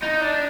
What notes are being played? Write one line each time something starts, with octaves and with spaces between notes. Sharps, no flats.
D#4
D4